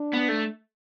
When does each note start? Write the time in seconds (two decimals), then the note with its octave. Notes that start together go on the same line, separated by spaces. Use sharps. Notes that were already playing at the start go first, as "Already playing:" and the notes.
Already playing: D4
0.14 B3
0.29 A3